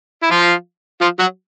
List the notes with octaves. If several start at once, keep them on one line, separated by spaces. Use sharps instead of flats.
E4
F3 F4
F3 F4
F#3 F#4